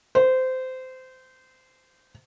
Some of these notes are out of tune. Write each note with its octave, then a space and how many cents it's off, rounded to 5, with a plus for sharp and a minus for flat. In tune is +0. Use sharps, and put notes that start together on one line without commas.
C5 -20